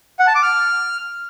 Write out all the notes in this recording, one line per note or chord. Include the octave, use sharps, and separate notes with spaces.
F#5
A5
D6
F6